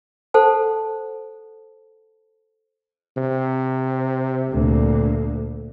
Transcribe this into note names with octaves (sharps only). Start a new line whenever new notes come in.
A4 C5 F#5 A5
C3
D2 A#2